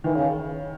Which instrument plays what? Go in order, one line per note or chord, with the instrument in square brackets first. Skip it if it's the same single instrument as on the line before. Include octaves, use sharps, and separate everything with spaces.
[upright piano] D#3 [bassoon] E3
[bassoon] C#3